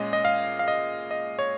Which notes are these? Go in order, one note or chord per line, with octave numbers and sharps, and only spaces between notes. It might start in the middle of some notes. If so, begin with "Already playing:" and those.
Already playing: A#2 G#3 C#4 D#5
D#5
F5
F5
D#5
D#5
C#5